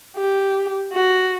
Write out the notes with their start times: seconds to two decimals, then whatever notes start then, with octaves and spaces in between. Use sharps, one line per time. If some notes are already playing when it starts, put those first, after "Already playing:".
0.17 G4
0.93 F#4